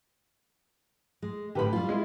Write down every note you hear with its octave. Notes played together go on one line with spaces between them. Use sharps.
G#3
A2 D3 G4 B4 B5
G3 F4
G#3 E4